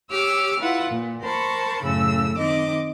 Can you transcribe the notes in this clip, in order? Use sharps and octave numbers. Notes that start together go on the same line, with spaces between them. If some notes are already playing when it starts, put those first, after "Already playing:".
G4 C#5 D6 E6 F6
E4 F4 B4 F#5
A#2
A#4 C5 A5 B5 C#6
F#2 A2 C#3 E6
D#3 C4 D#5 D6